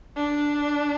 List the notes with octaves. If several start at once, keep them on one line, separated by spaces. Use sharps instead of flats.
D4